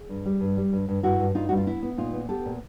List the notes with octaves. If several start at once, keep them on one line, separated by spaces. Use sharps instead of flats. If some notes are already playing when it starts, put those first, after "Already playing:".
Already playing: G#4
G2
G3
G2
G3
G2
G2
G2 E4 F#4
G2
G2 D#4 F4
G2 F#4
F4
B3 E4
B3
A#2 D#4 F4
B3
B3 G4 A4
A#2